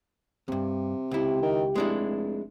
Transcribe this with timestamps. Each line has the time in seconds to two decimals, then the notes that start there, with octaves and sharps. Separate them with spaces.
0.48 E2 G2 C3
1.11 C#2 E4 G4
1.42 D#3
1.75 F1 G#3 D4 E4